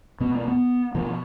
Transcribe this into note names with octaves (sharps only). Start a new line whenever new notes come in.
B2 B3
A#3
B3
B2 F3